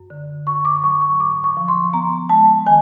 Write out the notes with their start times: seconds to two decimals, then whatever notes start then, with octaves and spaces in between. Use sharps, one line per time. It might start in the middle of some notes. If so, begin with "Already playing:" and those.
Already playing: F#2
0.10 D3
0.47 F#2 C#6
0.65 D6
0.84 F#3 C#6
1.01 C#6
1.20 G#2 D6
1.44 C#6
1.57 F3
1.68 C6
1.93 B3 A#5
2.29 G#3 A5
2.66 D#3 G#5